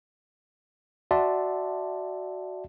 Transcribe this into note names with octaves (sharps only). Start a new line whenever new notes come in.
F#4 D5 E5 F#5 A5 C6